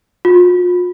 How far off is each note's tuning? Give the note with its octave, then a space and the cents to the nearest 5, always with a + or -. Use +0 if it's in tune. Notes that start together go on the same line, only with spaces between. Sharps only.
F4 +40